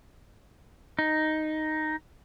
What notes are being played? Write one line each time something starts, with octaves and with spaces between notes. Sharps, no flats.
D#4